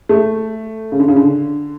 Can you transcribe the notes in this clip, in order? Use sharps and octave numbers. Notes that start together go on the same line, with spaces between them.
A3
C#3
D3
C#3
D3